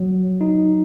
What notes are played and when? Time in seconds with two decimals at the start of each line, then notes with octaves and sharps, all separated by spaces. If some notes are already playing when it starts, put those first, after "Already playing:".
Already playing: F#3
0.41 D#4